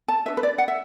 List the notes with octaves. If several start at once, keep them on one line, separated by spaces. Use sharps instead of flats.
A5
D4 F#4 B4 E5
B4
D5
F#5
E5